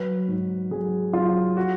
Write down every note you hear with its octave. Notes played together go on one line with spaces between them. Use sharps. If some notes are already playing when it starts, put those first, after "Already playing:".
Already playing: F#3 B4
G#2
F#3 G#4
F#3 F4
F#4